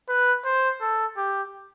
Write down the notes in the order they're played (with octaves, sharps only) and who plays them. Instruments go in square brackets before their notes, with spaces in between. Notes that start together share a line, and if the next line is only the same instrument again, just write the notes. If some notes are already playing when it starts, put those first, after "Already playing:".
[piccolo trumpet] B4
C5
A4
G4